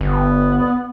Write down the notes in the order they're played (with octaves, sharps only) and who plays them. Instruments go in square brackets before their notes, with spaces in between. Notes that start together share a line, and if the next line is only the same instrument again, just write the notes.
[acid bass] G1 [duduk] B3